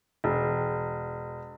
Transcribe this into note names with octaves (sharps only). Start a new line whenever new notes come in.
E1